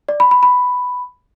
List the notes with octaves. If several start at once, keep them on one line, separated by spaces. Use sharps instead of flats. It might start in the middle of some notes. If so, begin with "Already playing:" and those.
D5
B5
B5
B5